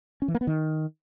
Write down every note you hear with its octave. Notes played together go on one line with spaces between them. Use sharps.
C#4
E3
A#3
B3
D#3